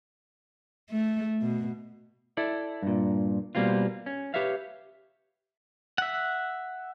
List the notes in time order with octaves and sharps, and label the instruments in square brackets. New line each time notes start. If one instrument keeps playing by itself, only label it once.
[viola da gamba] A3
B2
[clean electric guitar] E4 A4 D5
G2 A#2
B2 G3 A#3 C4 F4
C#4
G4 B4 C#5 E5 F5
[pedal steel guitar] E5 F#5